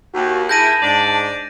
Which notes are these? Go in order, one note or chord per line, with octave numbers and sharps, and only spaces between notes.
D#2 F#4
D#3 A#3 E4 G#4 A5 G6 A#6 D#7
G#2 D4 D5